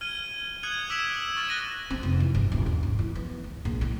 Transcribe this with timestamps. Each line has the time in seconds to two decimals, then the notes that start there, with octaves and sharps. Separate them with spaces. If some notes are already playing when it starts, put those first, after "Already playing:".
0.01 F6 G#6 D#7 G7
0.63 D#6 F#6 G#6 C#7 F#7
0.90 D6 E6 B6 D7 E7 F#7
1.36 C#6 F6 A6 E7
1.48 F#6 A#6 D#7 E7
1.90 C4
2.03 F1
2.20 E3
2.35 G1
2.52 D#1
2.66 D3
2.83 G#1
2.99 E3
3.15 B3
3.44 D2
3.65 A#1
3.81 A2